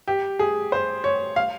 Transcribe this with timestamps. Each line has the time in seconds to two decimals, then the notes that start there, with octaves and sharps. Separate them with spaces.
0.07 G4
0.39 G#4
0.72 C5
1.04 C#5
1.36 F5